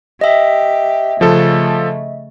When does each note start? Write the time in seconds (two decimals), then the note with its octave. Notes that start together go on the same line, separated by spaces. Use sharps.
0.21 G4 D#5 E5
1.21 C#3 F3 A3 A4